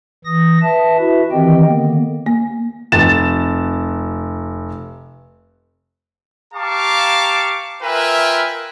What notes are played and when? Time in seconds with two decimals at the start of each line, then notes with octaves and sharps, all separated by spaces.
0.25 E3 D#6 A#6
0.62 B4 E5 A5
0.99 E4 F#4 B4 E5
1.32 D#3 E3 C4 G4 D#5 G5
1.66 D3 D#3 A#3 B3
2.26 A#3
2.92 F1 A6 E7
6.54 G4 F5 A5 A#5 C#6 D6
7.82 F4 A#4 B4 E5 G5 G#5